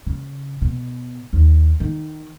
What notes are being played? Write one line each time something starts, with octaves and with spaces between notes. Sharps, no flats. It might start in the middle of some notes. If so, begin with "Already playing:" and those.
C#3
B2
D#2
D#3